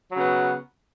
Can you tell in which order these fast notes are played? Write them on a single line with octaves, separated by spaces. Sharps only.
F#3 C#3 B3